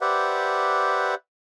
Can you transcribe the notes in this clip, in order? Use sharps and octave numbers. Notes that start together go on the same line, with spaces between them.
G4 B4 C5 D5 E5 F#5